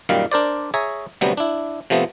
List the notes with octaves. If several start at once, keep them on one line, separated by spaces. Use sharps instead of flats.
F#2 A#2 D#3 G3 F5
D4 A#4 C5 D5
G#4 C#5 E5 G#5 A#5
D2 C3 F#3 G3 B3
D4 E4
C3 F3 A3 B3